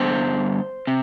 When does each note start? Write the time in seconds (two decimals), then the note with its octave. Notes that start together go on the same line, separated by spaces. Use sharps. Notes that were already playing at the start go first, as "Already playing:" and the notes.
Already playing: G2 D3 G3 B3 C5
0.87 C3